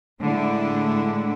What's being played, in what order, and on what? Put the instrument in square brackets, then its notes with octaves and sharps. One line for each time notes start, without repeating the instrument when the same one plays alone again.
[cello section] A2 D3 G#3 A3 D4 E4